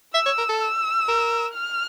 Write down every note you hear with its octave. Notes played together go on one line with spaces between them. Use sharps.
E5 E6
C#5
A#4
A4
E6
A#4
F6